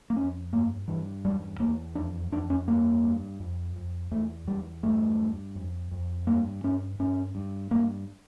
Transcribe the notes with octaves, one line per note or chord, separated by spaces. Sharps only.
A#3
F2 C#4
G2 A#3
G2 E3
E2 G3
E2 A#3
F2 D4
F2 D4
C#4
G2 A#3
G2
F2
F2
E2 A3
E2 G3
G2 A3
G2
F2
F2
G2 A#3
G2 C#4
G2 C#4
G2
G2 A#3